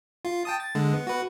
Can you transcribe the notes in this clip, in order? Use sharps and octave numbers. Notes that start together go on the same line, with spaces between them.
F4
G5 A5 D#6
A6
D3 G#3
B3
F#4 B4